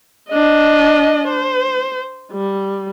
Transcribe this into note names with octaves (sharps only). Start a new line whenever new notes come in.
D4 D#5
C5
G3